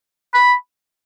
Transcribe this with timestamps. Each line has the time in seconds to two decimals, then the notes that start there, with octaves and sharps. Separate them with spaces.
0.34 B5